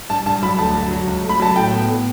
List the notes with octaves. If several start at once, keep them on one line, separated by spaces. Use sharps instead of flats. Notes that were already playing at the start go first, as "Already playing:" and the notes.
G2 A5
G2 A5
F#3 B5
D2 A5
F#3
F#3
C#2
A3
B5
F#3 A5
A2 G5
B3
A2